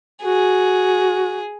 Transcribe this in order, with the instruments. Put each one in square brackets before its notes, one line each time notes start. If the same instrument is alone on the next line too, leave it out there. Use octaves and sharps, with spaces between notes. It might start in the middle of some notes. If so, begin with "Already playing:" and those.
[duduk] F#4 [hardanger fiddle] G#4